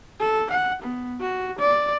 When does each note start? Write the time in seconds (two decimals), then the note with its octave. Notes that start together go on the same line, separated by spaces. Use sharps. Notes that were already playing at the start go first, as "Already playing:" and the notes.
0.19 A4
0.50 F#5
0.82 B3
1.20 F#4
1.58 D5